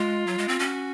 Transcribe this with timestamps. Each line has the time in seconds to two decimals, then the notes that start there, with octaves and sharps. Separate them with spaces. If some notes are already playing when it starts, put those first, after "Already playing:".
Already playing: G#3 F4
0.27 F#3
0.38 G#3
0.48 C4
0.59 C#4 F#4